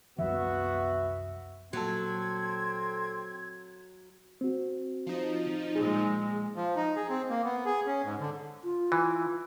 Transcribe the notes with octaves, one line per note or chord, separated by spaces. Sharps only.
C2 F#2 F3 B3 F#4 E5
A#2 F#3 C4 A4 G#6
C4 F#4
F3 D#4
A#2 G#3 G#4
F3
D#4
G#4
C4
A#3
B3
G#4
C#4
G#2
D3
F4
E3